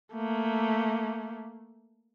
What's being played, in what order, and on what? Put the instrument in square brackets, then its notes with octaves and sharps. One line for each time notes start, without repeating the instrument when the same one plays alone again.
[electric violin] A3 A#3